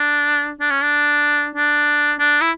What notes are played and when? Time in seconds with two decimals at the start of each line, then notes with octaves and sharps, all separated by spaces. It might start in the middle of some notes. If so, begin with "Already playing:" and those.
Already playing: D4
0.60 D4
0.71 C#4
0.82 D4
1.56 D4
2.20 D4
2.41 E4